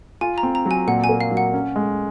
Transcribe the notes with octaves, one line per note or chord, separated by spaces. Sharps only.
F4 G#5
A#5
C4
A#5
F#3
G#5
A#2 F#5
G#5
A#3
F5
F#3
F#5
C#4
G#3